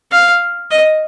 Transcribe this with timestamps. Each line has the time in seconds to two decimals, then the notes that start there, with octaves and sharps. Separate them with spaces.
0.12 F5
0.71 D#5